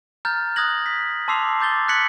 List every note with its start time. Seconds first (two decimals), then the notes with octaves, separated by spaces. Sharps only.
0.25 A#5 F6 G6 A6
0.56 D#6 F#6 G#6 A#6 F#7
0.86 B6
1.28 A5 C6 D6 E6 C7 F7
1.59 A#5 D6 G6 A6 G7
1.88 F#6 G#6 B6 C#7 F#7